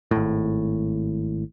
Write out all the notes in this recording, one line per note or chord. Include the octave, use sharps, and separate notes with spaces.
G#1 A2